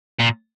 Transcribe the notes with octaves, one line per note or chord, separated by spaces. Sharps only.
A#2